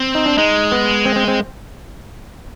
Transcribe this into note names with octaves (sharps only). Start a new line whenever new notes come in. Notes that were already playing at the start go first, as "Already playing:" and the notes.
Already playing: C4
D#4
D4
G#3 D#4
B3
C4
C4
C4